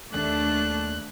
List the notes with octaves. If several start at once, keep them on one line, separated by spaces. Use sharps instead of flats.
D#2 A3 D4 F#6